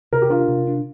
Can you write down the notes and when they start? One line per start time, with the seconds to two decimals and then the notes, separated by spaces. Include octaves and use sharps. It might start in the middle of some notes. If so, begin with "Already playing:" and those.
0.13 C3 A#4
0.22 G4
0.30 D4 F4 A#4
0.48 C3
0.67 D4